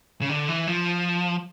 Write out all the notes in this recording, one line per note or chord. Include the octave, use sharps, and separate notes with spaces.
C#3
D3
E3
F3